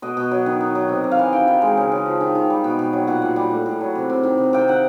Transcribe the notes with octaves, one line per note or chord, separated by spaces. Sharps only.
B2 D#5
B2
F#3
D#3
D#3
F#3
C3
C3
F5
E3
D#3 G5
D#3
G#3
C#3
C#3
F3
D#3
D#3
G3
B2
B2
F#3
A#2 F#5
A#2
G3
A2
A2
F#3
C3
C3
D#3
C3
C3 G5
D#3 F#5